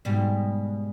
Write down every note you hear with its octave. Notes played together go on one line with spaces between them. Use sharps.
G#2 B2 G3